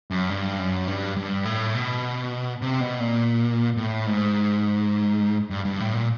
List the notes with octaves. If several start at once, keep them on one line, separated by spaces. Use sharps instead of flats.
F#2
G2
F#2
G2
G2
A2
B2
C3
B2
A#2
A2
G#2
G2
G2
A2
A#2